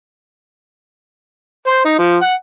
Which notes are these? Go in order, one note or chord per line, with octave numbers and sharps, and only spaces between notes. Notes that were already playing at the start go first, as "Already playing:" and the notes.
C5
D#4
F3
F#5